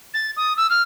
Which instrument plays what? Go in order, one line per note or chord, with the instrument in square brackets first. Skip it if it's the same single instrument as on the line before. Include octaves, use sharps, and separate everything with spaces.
[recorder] A6
D#6
E6
F6